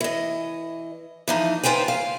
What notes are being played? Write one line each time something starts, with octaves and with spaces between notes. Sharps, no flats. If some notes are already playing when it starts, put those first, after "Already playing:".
E3 D#5
E3 F3 D#4
F4 B4 C5 G5 G#5
F5